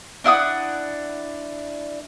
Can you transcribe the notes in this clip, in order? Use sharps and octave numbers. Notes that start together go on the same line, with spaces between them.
D4 E4 F#5 D#6